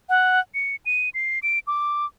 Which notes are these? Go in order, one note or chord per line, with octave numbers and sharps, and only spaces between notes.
F#5
C#7
D#7
C7
D7
D6